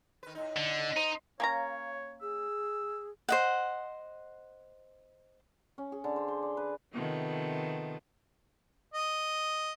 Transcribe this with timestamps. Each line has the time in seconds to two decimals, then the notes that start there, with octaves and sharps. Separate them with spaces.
0.23 D#3 B4
0.35 A2 D#4
0.56 D3
0.96 D#4 C5
1.40 A#3 C#4 C#5 F5 A#5
2.22 G#4 E6
3.29 C5 D#5 F#5
5.78 C#4
5.92 G#4
6.04 D3
6.16 C5
6.28 C5
6.43 D5
6.57 B4
6.93 C3 D#3 F3 A3 B3
8.94 D#5